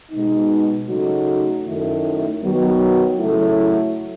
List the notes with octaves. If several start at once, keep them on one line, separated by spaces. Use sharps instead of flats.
B2 G#3 D#4
C#3 F#3 A3 D#4 F#4
F#2 D#3 A3 E4
D#3 F#3 B3
C#3 F#3 A3 E4